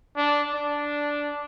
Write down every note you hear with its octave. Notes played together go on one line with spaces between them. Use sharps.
D4
D4